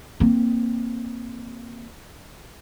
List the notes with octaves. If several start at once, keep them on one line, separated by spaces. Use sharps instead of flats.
A#3 C4